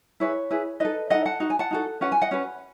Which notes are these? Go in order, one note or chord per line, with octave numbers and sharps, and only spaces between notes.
E4 G#4 B4 C#5
E4 G#4 B4
D#4 A4 B4 D#5
D#4 A4 D#5 F#5
F#5 A5
D#4 F#4
G#5
F#5 A5
D#4 F#4 A4
C#4 F#4 B4 F#5
G#5
D#5 F#5
C#4 F#4 B4